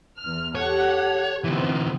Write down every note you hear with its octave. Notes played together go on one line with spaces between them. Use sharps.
E2 F6
G4 A4 C#5 F#5
D3 E3 B3 C4